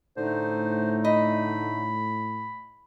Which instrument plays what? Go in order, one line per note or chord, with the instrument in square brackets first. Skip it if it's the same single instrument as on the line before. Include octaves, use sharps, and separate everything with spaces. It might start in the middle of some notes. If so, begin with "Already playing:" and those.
[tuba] A2 [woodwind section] D3 A3 D#4 [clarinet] C5
[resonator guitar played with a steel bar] D#5 [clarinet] B5